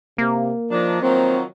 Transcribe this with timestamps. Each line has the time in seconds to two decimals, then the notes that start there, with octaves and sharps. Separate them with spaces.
0.18 C3 A#3
0.71 D#3 F3 D4
1.02 D#3 F3 F#3 C4